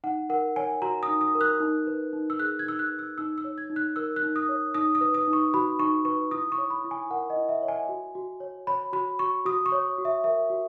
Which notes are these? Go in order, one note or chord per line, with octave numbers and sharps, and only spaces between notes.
D#4 F#5
A#4 F#5
C#5 G#5
F#4 A#5
D#6
D#4
D#6
A#4
F#6
D#4
B4
D#4
E6
G#4 F#6
G#6
D#4 E6
F#6
B4
E6
D#4 E6
E6
C#5
G#6
D#4
F#6
A#4 E6
F#6
D#4
D#6
C#5
D#4 D#6
D#6
B4
D#6
D#4
C#6
F#4 B5
D#4 C#6
B4 C#6
E4 D#6
C#6
C#5
B5
E4
G#5
A#4 F#5
D#5
E4
E5
C#5
G#5
F#4
F#4
C#5
C#5 B5
F#4 B5
F#4 C#6
F#4 D#6
C#6
C#5
F#4
E5
A#4 E5
F#4